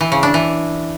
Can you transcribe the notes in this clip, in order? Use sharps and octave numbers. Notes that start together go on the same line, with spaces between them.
E3
C#3
D4
E3